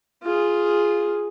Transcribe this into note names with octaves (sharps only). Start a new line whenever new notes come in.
F4 G#4